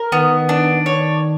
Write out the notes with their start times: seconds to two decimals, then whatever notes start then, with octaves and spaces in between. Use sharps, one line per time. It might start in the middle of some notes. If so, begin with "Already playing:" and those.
Already playing: A#4
0.12 D#3 B3
0.49 D4
0.86 C#5